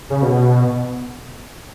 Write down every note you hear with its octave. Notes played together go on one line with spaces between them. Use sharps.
C#3
B2